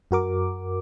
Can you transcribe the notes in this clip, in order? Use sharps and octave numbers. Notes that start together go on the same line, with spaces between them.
F#2 F#4 A#4 D6